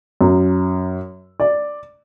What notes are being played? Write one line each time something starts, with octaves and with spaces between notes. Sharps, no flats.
F#2
D5